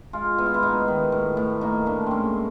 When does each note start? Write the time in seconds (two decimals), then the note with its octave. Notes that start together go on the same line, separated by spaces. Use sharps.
0.13 G#3 F4
0.38 B3 E4
0.46 F4
0.54 E4
0.63 B3 D#4
0.88 D#3
1.12 A2
1.37 A2
1.61 A#3 D#4
1.86 A2 D4
2.06 G#3 C4 C#4